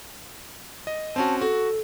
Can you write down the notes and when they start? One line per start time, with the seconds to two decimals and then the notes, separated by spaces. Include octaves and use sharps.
0.87 D#5
1.16 C4 C#4 F#4 A5
1.41 F#4 A4